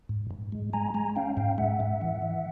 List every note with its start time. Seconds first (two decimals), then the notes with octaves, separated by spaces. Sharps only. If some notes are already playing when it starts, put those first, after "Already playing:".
0.09 G#2
0.31 G#2
0.52 G#3
0.73 G#3 G#5 A#5
0.94 G#3 G#5 A#5
1.16 C#4 F5 G5
1.37 G#2 F5 G5
1.58 G#3 E5 F#5
1.80 G#2
2.01 E3
2.22 E3